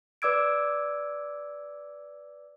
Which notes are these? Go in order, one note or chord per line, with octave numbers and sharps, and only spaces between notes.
B4 D5 D6 E6 G#6 D7